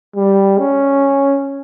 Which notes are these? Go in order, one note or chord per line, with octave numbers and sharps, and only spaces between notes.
G3
C#4